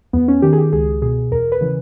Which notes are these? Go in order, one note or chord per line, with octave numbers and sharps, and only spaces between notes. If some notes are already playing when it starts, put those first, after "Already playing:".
E2 B3
C#4
D#3 G4
G#4
G4
C#2 G#4
B2 G#4
E2 A#4
B4
C#3 E3